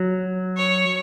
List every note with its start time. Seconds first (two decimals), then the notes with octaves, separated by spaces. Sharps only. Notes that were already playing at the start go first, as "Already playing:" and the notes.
Already playing: F#3
0.57 C#5